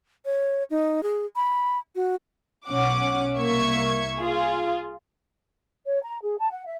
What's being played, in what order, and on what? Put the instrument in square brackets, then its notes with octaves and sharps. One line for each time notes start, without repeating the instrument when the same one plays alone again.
[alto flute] C#5
D#4
G#4
B5
F#4
[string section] B1 C#4 F#5 D6
C2 A#3 E5 C#6 G#6
F4 G#4
[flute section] C#5
A#5
G#4
A5
F#5
E5